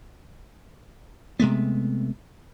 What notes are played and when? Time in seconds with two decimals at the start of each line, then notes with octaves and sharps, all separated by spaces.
1.40 C3 G#3 A3 B3